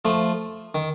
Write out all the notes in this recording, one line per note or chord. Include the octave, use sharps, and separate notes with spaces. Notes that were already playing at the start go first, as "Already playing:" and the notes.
F3 A3
D#3